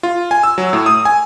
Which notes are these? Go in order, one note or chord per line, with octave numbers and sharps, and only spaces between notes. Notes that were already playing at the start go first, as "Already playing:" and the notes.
F4
G#5
E6
F#3
A2
D#6
G#5